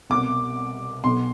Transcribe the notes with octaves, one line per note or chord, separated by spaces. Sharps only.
C2 B2 D6
B1 B2 C6